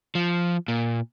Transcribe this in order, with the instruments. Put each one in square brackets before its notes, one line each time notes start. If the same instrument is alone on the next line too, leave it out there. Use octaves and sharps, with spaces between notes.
[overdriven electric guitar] F3
A#2